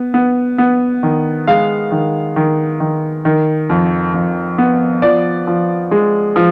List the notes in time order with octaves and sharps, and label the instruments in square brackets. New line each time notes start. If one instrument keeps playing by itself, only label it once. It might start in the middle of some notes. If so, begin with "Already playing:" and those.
Already playing: [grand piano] B3
B3
B3
D#3
G#3 F5
D#3
D#3
D#3
D#3
F2
F2
B3
F3 D5
F3
G#3
F3